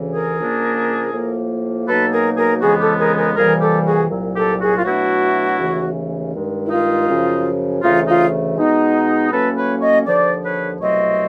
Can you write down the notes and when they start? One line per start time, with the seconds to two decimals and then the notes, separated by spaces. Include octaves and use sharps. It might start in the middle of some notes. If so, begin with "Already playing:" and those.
Already playing: D2 C#3 E3
0.13 G#4 A#4
0.38 C#3 F3 A#3 D4
1.13 A2 F3 A#3
1.87 B2 F#3 A#3 D#4 A4 B4
2.12 G#4 A#4
2.37 G#4 A#4
2.61 F2 C#3 E3 G#3 B3 F#4 G#4
2.80 G4 A4
2.99 G#4 A#4
3.17 G#4 A#4
3.36 F2 C3 E3 G3 A#3 G#4 A#4
3.61 G4 A4
3.85 F#4 G#4
4.10 C2 A#2 F#3
4.35 G4 A4
4.60 F#4 G#4
4.77 F4
4.84 B2 F#3 A3 D4 E4 F#4
5.59 D#2 C#3 E3 A3
6.34 G2 D#3 G#3
6.66 E4
6.71 D#4 F4
7.08 F#2 C#3 F3
7.82 D2 C#3 E3 A3 D#4 F4
8.07 D#4 F4
8.57 B2 G#3 B3 D#4
9.31 A2 F#3 A#3 C#4 A4 B4
9.56 B4 C#5
9.81 C#5 D#5
10.06 D#2 D3 F3 C5 D5
10.43 B4 C#5
10.80 C2 B2 F#3 A3 C4 C#5 D#5